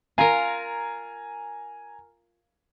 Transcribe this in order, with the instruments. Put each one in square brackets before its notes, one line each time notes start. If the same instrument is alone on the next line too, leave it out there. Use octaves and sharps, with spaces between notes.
[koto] F4 A#4 [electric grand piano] G#5 A#5